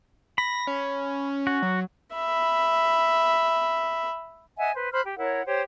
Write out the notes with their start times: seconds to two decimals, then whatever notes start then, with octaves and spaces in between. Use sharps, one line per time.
0.38 B5 A#6
0.67 C#4
1.47 F#4
1.62 F#3
2.14 E5 B5
4.57 D#5 E5 F#5 G#5
4.75 B4 C5
4.92 C5 B5 F6 F#6
5.03 G4
5.17 E4 A#4 C#5 F#5
5.46 G4 C5 C#5